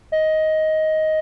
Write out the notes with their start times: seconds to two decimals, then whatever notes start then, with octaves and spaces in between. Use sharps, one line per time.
0.12 D#5